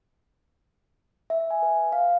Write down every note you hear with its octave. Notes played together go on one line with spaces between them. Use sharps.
E5
G#5
B4
F5